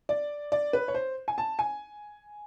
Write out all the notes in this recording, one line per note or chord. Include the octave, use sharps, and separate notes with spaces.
D5
D5
B4
C#5
C5
G#5
A5
G#5